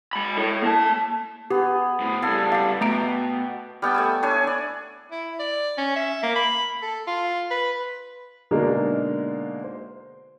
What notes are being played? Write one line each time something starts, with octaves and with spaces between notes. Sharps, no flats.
G#3 B5
E4 A4
A#3 A5
B3 G4 G#4
A2 C4
C#2 G3 A4 F5 G#5
G4 F5 C7
B2 A3 A#5 D7
G3 B3 G5 A5
A3 G#5 E6
D4 C#5 E5 G#5
D4 D5
E4
D5
C#4
E5
A#3
B5
A4
F4
B4
B2 D3 G#3 A#3 D4 D#4
C5